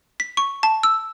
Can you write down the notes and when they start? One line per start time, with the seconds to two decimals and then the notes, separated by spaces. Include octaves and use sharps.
0.20 B6
0.37 C#6
0.63 A5
0.83 E6